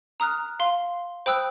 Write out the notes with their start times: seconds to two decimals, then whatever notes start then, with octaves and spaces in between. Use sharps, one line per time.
0.20 A#5 D#6 F6 F#6
0.60 F5 C6
1.26 C5 G5 B5 D#6 E6 F#6